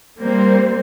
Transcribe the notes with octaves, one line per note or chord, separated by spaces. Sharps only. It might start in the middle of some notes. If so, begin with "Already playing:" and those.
G3 A#3 C4 C5